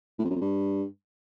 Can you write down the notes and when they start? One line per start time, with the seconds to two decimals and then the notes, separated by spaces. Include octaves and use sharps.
0.19 A2
0.24 F2
0.30 F#2
0.35 F2
0.41 G2